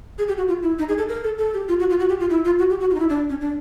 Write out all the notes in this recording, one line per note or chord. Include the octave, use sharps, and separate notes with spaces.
G#4
G4
F#4
F4
E4
D#4
G#4
A4
A#4
A4
A4
G4
F4
F#4
F4
F#4
G4
F4
E4
F4
F#4
G4
F#4
F4
D#4
E4
D4
C#4
D4